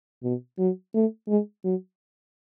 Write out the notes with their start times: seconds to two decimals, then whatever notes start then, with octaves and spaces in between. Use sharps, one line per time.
0.24 B2
0.59 F#3
0.95 A3
1.28 G#3
1.65 F#3